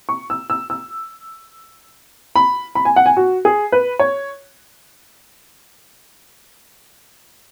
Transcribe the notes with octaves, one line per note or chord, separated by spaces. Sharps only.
C#6
E6
E6
E6
B5
B5
G#5
F#5
G#5
F#4
G#4
B4
C#5